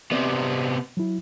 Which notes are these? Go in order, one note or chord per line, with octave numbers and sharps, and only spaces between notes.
C3 B3 D5
F#3 E4